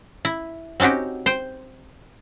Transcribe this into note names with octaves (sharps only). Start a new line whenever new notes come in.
E4
C4 C#4 D#4 F#4 G4
C5 G5